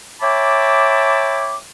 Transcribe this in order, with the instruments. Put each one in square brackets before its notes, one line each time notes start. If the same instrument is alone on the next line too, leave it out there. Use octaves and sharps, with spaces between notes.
[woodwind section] C#5 E5 G5 A5 B5 D6